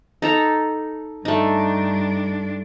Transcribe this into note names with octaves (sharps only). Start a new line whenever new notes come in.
D#4 A4 A#5
G2 A3 D4 D#4